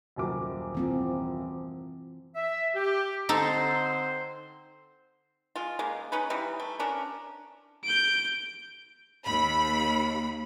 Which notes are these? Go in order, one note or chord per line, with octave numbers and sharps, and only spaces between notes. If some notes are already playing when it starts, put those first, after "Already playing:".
D#1 F#2 D6
E3 C4 F4
E5
G4
D3 C4 D#4 A4 C5
G#3 F4
C#3 G#3 A#3
C#4 D#4 B4
E3 G3 D#4
A3
C#4 D4 A#4
G6 D7
D#2 B5